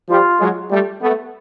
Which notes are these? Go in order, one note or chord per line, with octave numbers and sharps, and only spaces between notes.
F3 G3 F4
F#3 G#3
G3 A3
A3 B3